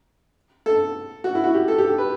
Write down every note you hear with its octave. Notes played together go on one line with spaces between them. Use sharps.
A4
F#4
E4
F#4
G4
A4
G4
A4
B4